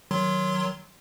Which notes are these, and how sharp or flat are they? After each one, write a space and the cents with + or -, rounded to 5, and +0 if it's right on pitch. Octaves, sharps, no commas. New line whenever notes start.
D#3 +0 F#3 +0 C6 +0